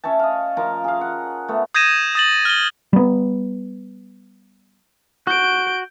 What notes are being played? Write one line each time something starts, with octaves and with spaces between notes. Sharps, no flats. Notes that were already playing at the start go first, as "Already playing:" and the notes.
C#4 C#5 E5 A5
D#5 F5
F3 A#4 F5 A#5
G#4 F5
F#5
A3 B3
D#6 G6 G#6 A#6 D#7 E7
D#6 A6 F#7
F6 G7
G3 B3
F#4 G6 D7